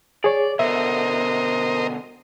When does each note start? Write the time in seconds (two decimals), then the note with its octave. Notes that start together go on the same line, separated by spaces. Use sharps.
0.24 G#4 C#5 D5
0.59 B2 D3 A#4 C5 D#5 E5